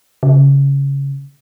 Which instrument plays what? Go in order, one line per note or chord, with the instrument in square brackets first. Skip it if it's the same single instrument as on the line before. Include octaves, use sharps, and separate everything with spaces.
[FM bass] C#3